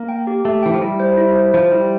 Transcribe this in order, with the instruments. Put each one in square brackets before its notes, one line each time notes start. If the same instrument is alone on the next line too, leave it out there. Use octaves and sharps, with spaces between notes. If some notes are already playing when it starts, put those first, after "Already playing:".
Already playing: [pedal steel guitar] A#3
[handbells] G5
G4
[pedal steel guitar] A3 [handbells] G4
[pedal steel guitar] E3 [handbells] G5
[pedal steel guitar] F3
[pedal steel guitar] G3 [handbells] E4
[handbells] C5
E4
C5
[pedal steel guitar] F3 [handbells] C5
[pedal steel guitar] G3 [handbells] E4